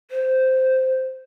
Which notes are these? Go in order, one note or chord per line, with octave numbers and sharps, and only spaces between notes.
C5